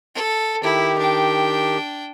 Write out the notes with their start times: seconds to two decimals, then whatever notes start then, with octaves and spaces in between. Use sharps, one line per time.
0.15 A4
0.63 D#3 E4 G4
0.98 D4 G5